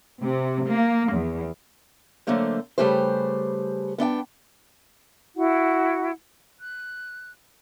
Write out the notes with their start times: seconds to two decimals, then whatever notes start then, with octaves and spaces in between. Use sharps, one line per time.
0.23 C3
0.67 A#3
1.13 E2
2.27 D3 F#3 A3 A#3 C5
2.78 C#3 G3 A3 G4 B4 C5
3.98 B3 D4 E5 G5
5.35 E4 F#4 F#5
6.58 F#6